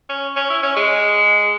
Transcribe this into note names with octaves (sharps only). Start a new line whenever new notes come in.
C#4
C#4
E4
C#4
G#3